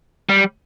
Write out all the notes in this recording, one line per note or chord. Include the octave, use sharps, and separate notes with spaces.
G3